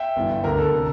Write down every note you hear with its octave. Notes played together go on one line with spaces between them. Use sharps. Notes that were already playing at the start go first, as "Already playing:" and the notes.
Already playing: E5 G5
G1 G2 E3
D2 D3 A#4
A4
C3